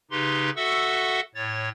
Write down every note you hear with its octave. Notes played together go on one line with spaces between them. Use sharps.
C#3 D#4 G4 B4 C6
F#4 A4 E5 F#5 C#6 E6
A2 C#5 A6